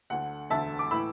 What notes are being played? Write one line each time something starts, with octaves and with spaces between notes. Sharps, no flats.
D2 D3 F#5
E1 D2 D3 E5 A5
D6
A2 E3 B5 E6